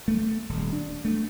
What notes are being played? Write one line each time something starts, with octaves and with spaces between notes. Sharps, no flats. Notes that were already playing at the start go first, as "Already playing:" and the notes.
A3
D#1
D4
A3